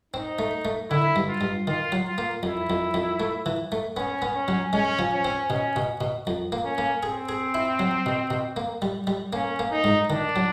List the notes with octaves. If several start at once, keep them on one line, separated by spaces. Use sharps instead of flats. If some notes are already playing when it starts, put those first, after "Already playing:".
C4 D#4
A3
A3
D3 E4
G2
F4
G2
D#3 F4
F#3
F4
A#3
F2 E4
F2
F2
A3
E3
A3
B3 C#4
B3
C#4
F#3
G#3 C#4
F3
C#4
C4
B2 C#4
B2
B2
F2
A#3
C#4
A#3
C4 G#4
G#4
E4
F#3
B2
B2
A#3
G3
G3
A#3 C#4
A#3
D#4
G#2
D#3 D4
F#3